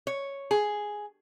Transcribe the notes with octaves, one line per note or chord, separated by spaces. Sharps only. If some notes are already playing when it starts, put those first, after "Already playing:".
C#5
G#4